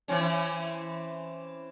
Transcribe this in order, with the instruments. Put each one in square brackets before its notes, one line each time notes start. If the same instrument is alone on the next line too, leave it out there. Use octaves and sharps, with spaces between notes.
[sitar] E3 C4 C#4